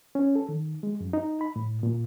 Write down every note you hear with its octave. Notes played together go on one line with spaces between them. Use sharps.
C#4
A4
D#3
G#3
F#2
D#4
B5
A2
A#2